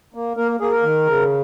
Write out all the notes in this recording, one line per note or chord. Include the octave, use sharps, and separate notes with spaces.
A#3
A#3 A#4
A#3 G#4
A#4
D#3
C#3